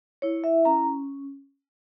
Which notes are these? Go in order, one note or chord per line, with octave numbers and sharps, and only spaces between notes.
E4 C#5
E5
C#4 A#5